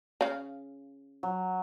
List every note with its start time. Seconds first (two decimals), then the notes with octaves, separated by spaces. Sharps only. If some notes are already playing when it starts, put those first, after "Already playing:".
0.21 C#3 F5
1.23 F#3